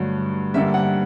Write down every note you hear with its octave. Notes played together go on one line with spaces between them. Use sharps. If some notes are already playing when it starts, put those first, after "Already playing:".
Already playing: G2 D3 F#3 A3
G2 D3 G3 A#3 E5
F#5